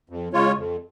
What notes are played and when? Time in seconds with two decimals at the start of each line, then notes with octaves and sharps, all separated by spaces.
0.10 F2
0.33 C#3 G#3 F4 C#5
0.57 F2